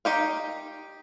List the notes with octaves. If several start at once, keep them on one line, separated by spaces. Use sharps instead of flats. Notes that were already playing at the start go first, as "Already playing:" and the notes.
D#4 G4 F5